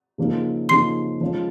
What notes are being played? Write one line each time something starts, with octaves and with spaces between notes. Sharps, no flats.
C#3 F3 A#3 D#4 G#4
C#3 F3 A#3 D#4 G#4 C6 C7
F3 G#3 C#4 F4